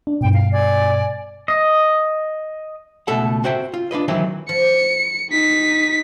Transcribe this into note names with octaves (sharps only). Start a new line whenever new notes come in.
D4
G2 B2 G5
F5
D5 G#5
D#5
C#2 B2 A3 A4 F#5
C4 F#4 C5 E5 G5
F4
D4 F4 B4 D#5
D#3 E3 F#3 G#3 C4 E4
F3 C#7
D#4 B6